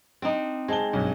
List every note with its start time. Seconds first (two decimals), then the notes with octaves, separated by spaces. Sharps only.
0.22 C4 D4 D#4
0.68 G#3 C4 A5 G7
0.93 B1 G2